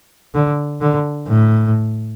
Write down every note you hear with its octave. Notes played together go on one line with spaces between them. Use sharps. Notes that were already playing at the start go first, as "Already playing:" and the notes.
D3
D3
A2